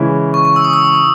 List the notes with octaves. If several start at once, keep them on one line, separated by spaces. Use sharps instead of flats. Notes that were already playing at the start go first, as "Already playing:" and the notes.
Already playing: C#3 E3 G#3 C#4 E4
C#6
C#6
E6
D#6
E6